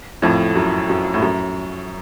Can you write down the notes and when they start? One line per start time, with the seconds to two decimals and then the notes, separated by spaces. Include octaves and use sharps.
0.22 F2 A2
0.56 F#2
0.89 F#2
1.14 A2
1.22 F#2